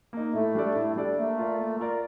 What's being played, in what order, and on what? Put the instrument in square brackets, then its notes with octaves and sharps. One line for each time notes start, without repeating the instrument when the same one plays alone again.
[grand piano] A#3 D#4
[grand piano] A2 [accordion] A3
[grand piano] G3 D4 A4 D5
A2
G3 D4 A4 D5
[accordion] A3 [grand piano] A#3
[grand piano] F4 A#4 D5
A#3
F4 A#4 D5